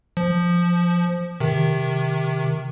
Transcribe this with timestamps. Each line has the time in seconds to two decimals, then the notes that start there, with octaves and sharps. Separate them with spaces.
0.17 F3
1.40 C3 D#3